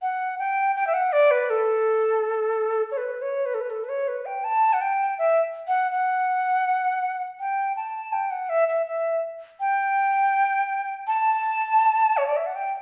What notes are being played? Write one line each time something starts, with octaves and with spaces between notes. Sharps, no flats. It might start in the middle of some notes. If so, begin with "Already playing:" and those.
F#5
G5
G5
E5
F#5
D5
B4
A4
C#5
B4
C#5
B4
A4
B4
A4
B4
C#5
B4
G5
A5
F#5
G5
E5
F#5
F#5
G5
A5
G5
F#5
E5
E5
E5
G5
A5
C#5
D5
E5
F#5
G5